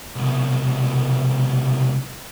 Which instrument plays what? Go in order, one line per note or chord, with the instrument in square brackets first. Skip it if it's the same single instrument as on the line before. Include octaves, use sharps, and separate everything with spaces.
[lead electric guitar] C2 B2